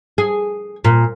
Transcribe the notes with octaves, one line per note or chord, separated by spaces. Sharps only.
G#4
A#2